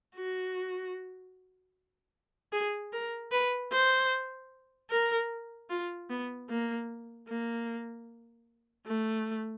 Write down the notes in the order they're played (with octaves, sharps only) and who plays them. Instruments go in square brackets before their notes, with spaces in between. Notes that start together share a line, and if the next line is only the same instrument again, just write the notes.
[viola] F#4
G#4
A#4
B4
C5
A#4
F4
B3
A#3
A#3
A3